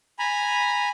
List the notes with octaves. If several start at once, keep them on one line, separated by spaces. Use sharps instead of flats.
G#5 A#5 B5